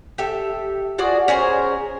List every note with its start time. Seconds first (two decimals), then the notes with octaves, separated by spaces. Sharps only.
0.18 G4 A4 E5
0.98 F4 F#4 G#4 D5
1.28 C#4 G#4 A#4 C5